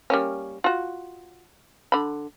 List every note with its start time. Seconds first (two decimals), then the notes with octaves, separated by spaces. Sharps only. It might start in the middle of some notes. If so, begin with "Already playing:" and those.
0.10 G3 A#3 C#4
0.64 F4 F#4
1.92 D3 B5